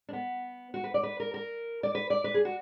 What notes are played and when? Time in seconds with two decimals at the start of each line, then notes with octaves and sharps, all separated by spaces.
0.09 D4
0.13 B3
0.74 F#4
0.84 B4
0.94 D5
1.03 B4
1.20 A#4
1.34 A#4
1.83 D5
1.95 B4
2.10 D5
2.24 B4
2.34 G#4
2.45 F#4